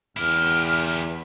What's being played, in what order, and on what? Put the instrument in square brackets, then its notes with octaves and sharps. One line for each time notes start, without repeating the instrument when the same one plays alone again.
[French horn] E2 [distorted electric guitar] E4 G4 [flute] F6